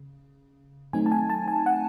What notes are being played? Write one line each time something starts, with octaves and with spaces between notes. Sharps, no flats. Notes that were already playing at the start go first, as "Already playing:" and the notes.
Already playing: C#3
D#3 F#3 A3 C4 D#4 G#5
A5
G#5
A5
G#5
F#5